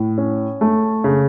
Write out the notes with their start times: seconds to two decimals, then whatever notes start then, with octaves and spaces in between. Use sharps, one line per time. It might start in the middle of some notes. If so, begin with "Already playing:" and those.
Already playing: A2
0.18 C#4
0.61 A3
1.04 C#3